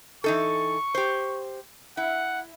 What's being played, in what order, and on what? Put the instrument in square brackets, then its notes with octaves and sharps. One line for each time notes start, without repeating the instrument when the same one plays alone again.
[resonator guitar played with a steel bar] E3 D#4 A4 [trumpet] C#6
[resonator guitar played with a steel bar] G4 C5
[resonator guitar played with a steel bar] E4 [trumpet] F#5